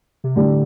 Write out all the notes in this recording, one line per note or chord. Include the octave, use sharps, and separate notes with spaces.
C3
A2 D3 G3 D4 G4